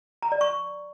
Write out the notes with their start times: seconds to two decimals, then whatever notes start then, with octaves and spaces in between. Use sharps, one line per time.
0.22 A#5
0.32 D5
0.41 C#6